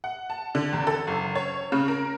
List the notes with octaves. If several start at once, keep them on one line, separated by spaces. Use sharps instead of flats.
F#5
A5
D3
E2
A4
F#1
C#5
C#3
A#4